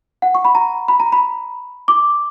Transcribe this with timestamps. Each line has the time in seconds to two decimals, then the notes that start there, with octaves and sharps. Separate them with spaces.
0.22 F#5
0.35 C#6
0.45 B5
0.55 A#5
0.88 B5
1.00 A#5
1.12 B5
1.88 D6